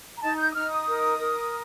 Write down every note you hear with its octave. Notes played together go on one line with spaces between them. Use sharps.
A#5
D#4 A5
G6
D#6
D#4 F6
D#6
A#4
A#4